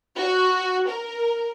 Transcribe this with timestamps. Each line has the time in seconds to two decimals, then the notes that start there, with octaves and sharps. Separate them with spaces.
0.17 F#4
0.88 A#4